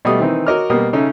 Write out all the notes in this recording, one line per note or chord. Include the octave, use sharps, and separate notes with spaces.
B2 G3 A3 D#6
D#3 E3 C4 D#4
F#4 A#4 C#5 D#5 D6 F6
B2 G3 A#3 D#6
C#3 C#4 D#4 A4 E5